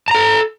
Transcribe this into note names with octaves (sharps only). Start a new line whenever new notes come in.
A4 A5 A#5